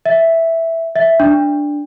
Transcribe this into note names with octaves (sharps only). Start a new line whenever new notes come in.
E5
E5
D4